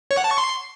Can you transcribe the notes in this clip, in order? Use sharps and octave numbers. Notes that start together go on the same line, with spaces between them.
C#5
F#5
A5
C#6
C6